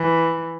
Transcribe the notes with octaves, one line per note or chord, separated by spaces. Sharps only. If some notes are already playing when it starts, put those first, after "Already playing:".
Already playing: E3